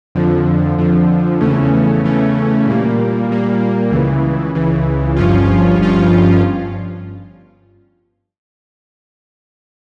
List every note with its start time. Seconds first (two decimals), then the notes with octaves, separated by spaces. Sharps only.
0.15 F2 D3 F3
0.78 F2 D3 F3
1.41 E2 C#3 E3 A3 C#4
2.04 E2 C#3 E3 A3 C#4
2.66 A#2 G3 A#3
3.29 A#2 G3 A#3
3.91 C#2 C#3 E3
4.54 C#2 C#3 E3
5.16 G1 G2 F3 C#4 F4
5.79 G1 G2 F3 C#4 F4